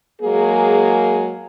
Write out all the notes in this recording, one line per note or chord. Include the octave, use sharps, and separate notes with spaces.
F#3 G#3 A#3 G#4